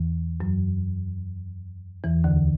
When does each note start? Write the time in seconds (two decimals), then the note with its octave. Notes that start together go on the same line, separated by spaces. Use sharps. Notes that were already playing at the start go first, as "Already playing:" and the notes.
Already playing: E2 E3
0.40 F#2 F#3
2.04 E2 E3
2.24 D2 D3